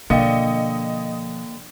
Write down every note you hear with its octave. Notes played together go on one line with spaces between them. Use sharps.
B2 D3 F3 A#3 D#5 F5 G5 C#7